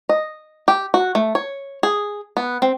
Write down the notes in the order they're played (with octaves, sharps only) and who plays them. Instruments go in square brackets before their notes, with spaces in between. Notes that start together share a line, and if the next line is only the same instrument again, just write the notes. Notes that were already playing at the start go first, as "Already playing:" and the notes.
[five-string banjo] D#5
G4
F#4
A3
C#5
G#4
B3
C4